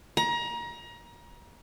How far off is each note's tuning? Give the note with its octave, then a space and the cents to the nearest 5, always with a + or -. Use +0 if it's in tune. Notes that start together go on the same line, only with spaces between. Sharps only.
A#5 +30